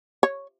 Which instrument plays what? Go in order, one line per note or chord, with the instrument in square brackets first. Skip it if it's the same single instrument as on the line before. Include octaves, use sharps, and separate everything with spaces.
[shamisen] C#5